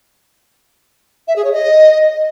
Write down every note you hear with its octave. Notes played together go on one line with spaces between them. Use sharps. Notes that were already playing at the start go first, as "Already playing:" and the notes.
E5
G#4
C#5
D#5